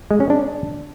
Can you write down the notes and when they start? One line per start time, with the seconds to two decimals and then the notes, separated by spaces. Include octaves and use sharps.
0.11 G#3
0.20 C#4
0.30 D4